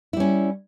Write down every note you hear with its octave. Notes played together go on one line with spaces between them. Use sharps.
G3 C#4 E4